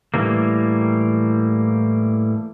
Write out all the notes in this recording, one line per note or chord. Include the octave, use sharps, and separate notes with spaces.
A2 E3 G3 A#3